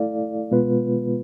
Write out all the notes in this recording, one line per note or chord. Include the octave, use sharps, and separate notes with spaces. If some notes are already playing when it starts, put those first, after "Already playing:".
Already playing: A3 E4 A4 D5 F5
B2 G#3 B3 F4 B4